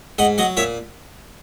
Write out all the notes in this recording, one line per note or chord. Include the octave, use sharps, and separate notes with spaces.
G#2 D#5 F#5
F#3 D#5 F#5
A#2 C#5 E5